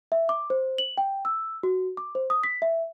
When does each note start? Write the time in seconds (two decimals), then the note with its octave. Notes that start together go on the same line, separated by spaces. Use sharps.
0.12 E5
0.29 D6
0.50 C5
0.78 F#7
0.98 G5
1.25 E6
1.63 F#4
1.97 D6
2.15 C5
2.30 D#6
2.44 B6
2.62 E5